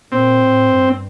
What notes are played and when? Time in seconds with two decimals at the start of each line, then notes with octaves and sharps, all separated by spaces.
0.11 A#2 C4
0.40 A2
0.68 G2